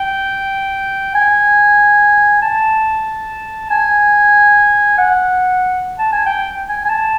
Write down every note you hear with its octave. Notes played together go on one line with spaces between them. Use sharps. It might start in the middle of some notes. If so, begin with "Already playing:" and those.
Already playing: G5
G#5
A5
G#5
F#5
A5
G#5
G5
G#5
G#5
A5